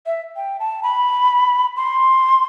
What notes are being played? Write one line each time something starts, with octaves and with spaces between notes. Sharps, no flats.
E5
G5
A5
B5
C6